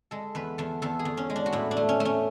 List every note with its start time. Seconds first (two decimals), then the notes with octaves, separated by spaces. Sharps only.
0.11 G#3 A4
0.35 E2 B4
0.58 E2 A4
0.82 E2 A4
0.99 G#4
1.05 E2
1.17 C#4
1.30 G#3
1.36 D4
1.46 F#4
1.53 A2 E4
1.71 D4
1.77 A3
1.89 C#4
2.00 A3
2.05 C#4